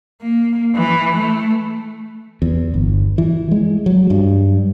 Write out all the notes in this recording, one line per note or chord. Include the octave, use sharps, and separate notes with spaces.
A#3
E3
A3
E2
G1
E3
G#3
F#3
G2